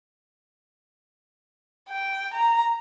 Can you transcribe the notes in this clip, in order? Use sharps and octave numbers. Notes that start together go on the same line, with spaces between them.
G5
A#5